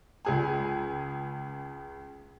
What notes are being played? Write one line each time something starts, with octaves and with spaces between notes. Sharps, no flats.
C#2 G#4 G#5